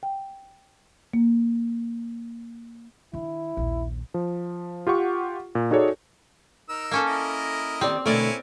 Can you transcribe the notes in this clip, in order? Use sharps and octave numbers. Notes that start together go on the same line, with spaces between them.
G5
A#3
D#3 D4 E4
A#1 D#2
F3
F4 G4 F#5 C#6
A#2
D#4 F#4 G#4 A4 C#5 D5
D#4 A#4 E6
A#3 C#4 A4
E4 A#4 D#5
D#3 C4 G4 D5
B2 D3 A3 E4 A#4 C#5 D5 G#5